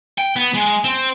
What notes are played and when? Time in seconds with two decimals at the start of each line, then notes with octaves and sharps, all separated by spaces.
0.18 G5
0.36 B3
0.54 G#3
0.84 C4